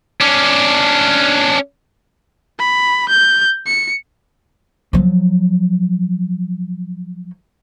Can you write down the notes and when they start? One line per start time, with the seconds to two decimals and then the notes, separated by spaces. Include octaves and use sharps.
0.21 C#4 D4
2.59 B5
3.09 G6
3.67 C#7
4.93 F3 F#3